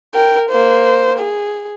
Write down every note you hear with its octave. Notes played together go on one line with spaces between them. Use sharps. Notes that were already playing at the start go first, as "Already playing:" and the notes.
A#4 G5
A#3 C5
G#4